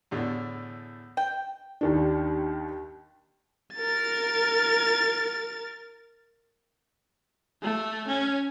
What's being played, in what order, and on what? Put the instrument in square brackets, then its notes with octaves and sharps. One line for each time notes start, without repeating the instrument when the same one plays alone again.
[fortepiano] E2 A2 D3
[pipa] G5
[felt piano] D#2 D#3 D4
[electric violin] A#4 A6
A3
C#4